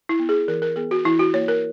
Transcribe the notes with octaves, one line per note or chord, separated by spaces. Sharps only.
E4
B3
G#4
E3 A#4
A#4
B3 G#4
F#4
E3 E4
F#4
A#3 C#5
A#4